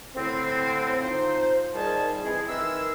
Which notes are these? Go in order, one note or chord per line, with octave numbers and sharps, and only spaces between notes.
A2 D3 C4
F3 D#4 C5
A#2 D#3 G3 G#4 C5 A5
E3 G#3 C4 E4 G#4
D#3 E3 A#4 C6 E6